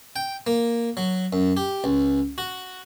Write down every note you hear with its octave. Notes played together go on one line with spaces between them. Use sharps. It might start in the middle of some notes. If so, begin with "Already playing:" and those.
G5
A#3
F#3
F#2
G4
C#2
F#4